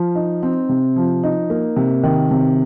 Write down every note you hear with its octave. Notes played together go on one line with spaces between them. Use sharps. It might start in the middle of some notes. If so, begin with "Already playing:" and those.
Already playing: F3
D#4
C4
C3
F3
D#4
A#3
C3
D#3
C3